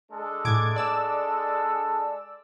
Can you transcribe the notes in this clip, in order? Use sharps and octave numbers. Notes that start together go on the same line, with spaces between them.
G#3 D4 A4
A2 D6 G#6
D5 E6